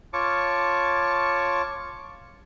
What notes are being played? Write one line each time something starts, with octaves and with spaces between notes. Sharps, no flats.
F4 C#5 A5 C#6 D6